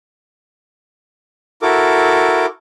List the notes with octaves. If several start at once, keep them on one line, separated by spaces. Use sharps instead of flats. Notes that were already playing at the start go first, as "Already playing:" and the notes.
E4 F#4 A4 A#4 D6